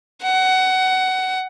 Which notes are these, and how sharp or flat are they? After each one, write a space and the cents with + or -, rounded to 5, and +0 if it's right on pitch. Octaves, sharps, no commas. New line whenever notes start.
F#5 +20